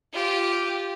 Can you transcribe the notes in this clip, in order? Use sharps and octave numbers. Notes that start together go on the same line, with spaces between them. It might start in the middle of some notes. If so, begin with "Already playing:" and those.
F4 G4